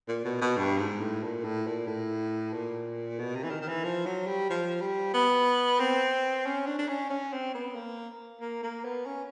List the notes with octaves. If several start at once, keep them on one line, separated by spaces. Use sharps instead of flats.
A#2
B2
B2
G2
G#2
A2
A#2
A2
A#2
A2
A#2
B2
C3
E3
D#3
D#3
E3
F3
F#3
G3
F3
G3
B3
C4
C#4
D4
D4
C#4
C#4
C4
B3
A#3
A#3
A#3
B3
C#4